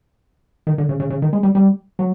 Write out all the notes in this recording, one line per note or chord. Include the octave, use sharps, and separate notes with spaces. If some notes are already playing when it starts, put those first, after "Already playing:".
D#3
D3
C#3
C#3
C#3
D#3
G#3
G3
G3
F#3